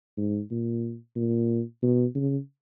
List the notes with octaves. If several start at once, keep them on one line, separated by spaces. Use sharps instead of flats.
G#2
A#2
A#2
B2
C#3